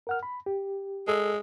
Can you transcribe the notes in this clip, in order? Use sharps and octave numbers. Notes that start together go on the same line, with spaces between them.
A#4 F#5 F6
B5
G4
G#3 A4 E6